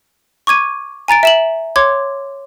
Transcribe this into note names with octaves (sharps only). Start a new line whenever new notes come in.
C#6 D6 G#6 D#7
G#5 A#5 A6 D7
E5 E7 F#7
C#5 C6 D6 G#6